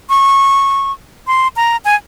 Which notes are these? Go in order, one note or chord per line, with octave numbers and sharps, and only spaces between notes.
C#6
C6
A#5
G#5